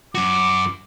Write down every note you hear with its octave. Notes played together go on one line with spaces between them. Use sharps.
F#2 F#4 D6